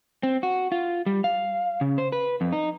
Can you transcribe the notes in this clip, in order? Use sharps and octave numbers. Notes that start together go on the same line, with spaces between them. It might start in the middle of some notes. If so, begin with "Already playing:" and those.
C4
F#4
F4
G3
F5
C#3
C5
B4
F2
D#4